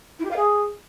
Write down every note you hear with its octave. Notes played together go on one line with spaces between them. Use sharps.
E4
G4
F5
G#4